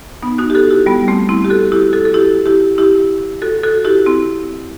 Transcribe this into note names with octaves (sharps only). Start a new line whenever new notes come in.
B3 D#4
D#4 F#4
G4
F#4 A4
E4 G4
G3 B3
A3 C4
C4 E4
G4
F#4 A4
E4 G4
F#4 A4
A4
E4 G4
E4 G4
E4 G4
F#4 A4
F#4 A4
E4 G4
C4 E4